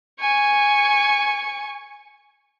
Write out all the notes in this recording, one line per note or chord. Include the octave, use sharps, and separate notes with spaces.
G#5 C#6